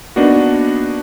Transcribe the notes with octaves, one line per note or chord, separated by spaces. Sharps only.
A#3 B3 D4 D#4 F#4